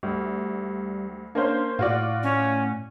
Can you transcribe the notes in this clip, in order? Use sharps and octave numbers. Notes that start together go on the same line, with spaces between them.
D2 G3
A#3 C#4 D4 C5
A2 F4 F#4 D5
C#4